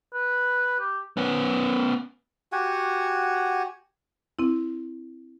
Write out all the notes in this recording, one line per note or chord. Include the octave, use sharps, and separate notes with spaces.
B4
G4
B3 C#4
F#4 G4 F#5 G#5
C4 E4